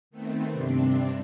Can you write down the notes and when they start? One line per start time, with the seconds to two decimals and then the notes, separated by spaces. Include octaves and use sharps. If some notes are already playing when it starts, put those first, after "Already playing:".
0.10 D#3 A3 B3 C4
0.51 G2 C3 C4 D4